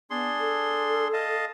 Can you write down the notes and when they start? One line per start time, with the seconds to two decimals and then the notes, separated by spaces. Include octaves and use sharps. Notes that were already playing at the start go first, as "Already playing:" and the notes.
0.10 B3 D4 G#4 C6
0.40 A4
1.13 D#5 F5 A5